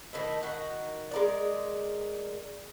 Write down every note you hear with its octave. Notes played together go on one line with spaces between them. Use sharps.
D#3 A3 E4
D#3 F#4
G#3 A#4 D5